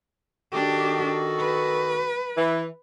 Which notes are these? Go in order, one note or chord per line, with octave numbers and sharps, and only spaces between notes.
D#3 D4 F#4 G4 A4
B4
E3